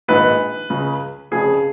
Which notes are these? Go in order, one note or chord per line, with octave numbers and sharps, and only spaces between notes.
A#1 G#2 D#3 B4
C#2 C#3
F1 F2 C#3 G#4